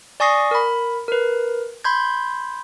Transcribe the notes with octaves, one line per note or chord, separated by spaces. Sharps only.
D5 G#5 C#6 D#6 A#6 C7
A#4 B5
A#4 B4
B5 C6 G6 G#6